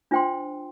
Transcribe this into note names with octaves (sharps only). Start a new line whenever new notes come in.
D4 F4 C5 G5 C6